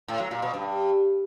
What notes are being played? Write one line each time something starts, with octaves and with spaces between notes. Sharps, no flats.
A2
F#3
A#2
B2
G2